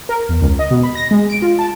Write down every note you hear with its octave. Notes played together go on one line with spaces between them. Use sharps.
A#4
E2
C#2
D#5
B2
B5
A#6
G#3
D7
F4
A5